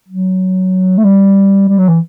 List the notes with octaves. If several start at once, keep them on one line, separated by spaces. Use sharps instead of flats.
F#3
A3
G3
G3
F#3
E3